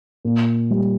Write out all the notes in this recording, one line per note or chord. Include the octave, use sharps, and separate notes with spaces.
A#2
G3